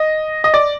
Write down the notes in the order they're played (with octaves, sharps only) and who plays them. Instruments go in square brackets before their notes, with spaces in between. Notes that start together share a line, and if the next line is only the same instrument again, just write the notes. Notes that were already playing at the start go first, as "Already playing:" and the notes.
Already playing: [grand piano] D#5
D#5
D5